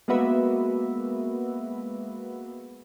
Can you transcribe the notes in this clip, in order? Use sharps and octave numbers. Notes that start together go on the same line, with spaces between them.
G#3 A#3 B3 F#4 B4 E5